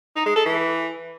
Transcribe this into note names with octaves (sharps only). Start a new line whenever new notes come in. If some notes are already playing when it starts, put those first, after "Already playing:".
D#4
G#3
A4
E3